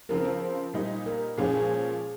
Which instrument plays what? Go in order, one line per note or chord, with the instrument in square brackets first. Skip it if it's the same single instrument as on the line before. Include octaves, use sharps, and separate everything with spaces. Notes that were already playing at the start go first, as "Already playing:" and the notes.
[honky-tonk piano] C#3 F3 C4 [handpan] A#4
[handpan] C5
[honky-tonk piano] A#2 G3 A#3 D#4
[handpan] A#4
[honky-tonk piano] A#2 F3 A#3 C#4 [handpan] G#4
[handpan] G#4